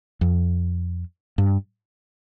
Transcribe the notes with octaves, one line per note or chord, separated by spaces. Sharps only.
F2
G2